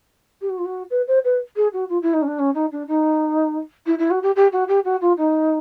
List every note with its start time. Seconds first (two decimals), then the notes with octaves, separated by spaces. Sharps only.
0.41 G4
0.49 F#4
0.58 F4
0.65 F#4
0.90 B4
1.07 C5
1.24 B4
1.56 G#4
1.73 F#4
1.89 F4
2.02 E4
2.13 D#4
2.22 C#4
2.27 D4
2.39 C#4
2.54 D#4
2.71 D4
2.87 D#4
3.86 E4
3.98 E4
4.10 F#4
4.22 G4
4.36 G4
4.52 F#4
4.68 G4
4.84 F#4
5.01 F4
5.17 D#4